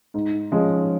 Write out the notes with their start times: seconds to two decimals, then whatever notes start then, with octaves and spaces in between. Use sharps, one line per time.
0.14 G#2
0.52 F3 G#3 C#4